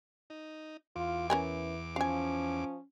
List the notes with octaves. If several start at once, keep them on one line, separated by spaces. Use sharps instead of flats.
D#4
E2 F4 D6
E3 C#4 A#4 G#5
F3 C#4 F5 G#5